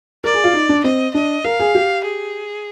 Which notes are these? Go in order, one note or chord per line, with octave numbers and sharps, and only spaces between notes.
A#4 D5
G#4
F4
D#4
D4
C4 D#5
D4 D#5
A#4 F5
G#4
G4
G#4